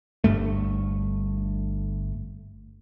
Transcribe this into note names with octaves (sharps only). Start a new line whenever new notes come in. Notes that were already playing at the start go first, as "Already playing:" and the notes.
G1 E2 G2 A3